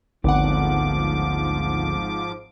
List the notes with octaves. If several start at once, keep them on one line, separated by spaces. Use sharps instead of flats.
G#1 D2 G#2 D3 F3 B3 F#5 D6